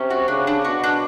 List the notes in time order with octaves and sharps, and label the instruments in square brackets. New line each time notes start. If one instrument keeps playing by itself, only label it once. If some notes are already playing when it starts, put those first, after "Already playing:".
Already playing: [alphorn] C3 [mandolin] C#4
[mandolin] F#4
[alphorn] C#3 [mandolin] D4
[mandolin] D4
[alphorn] B2 [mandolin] F#4
[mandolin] D4